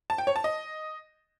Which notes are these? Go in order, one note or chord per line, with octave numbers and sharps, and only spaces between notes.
A5
G5
C#5
A5
D#5